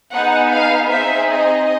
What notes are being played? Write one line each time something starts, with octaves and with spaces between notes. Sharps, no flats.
B3 D#4 G#4 F#5
F5
C4 D#4 G#4 E5
D#5